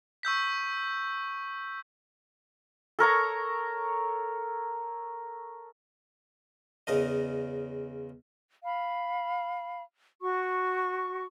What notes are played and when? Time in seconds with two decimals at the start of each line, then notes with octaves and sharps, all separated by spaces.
0.23 C#6 E6 G6 B6
2.99 A4 A#4 C#5 A#5
6.87 E2 C#3 A#4 D#5
8.65 F5 B5
10.22 F#4 C#6